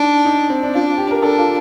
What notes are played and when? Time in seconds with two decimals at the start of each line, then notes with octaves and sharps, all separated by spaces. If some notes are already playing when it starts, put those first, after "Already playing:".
Already playing: D4 D#4
0.25 D#4
0.49 C4
0.63 D4
0.74 D4 F4
0.98 G4
1.11 A#4
1.22 D4 A4
1.38 F4